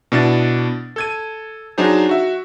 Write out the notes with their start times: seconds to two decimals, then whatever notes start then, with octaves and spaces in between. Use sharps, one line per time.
0.12 B2 D4 E4 A6
0.96 A4 G#6 D#7
1.78 F#3 D4 D#4 G#4 C5
2.09 F#4 E5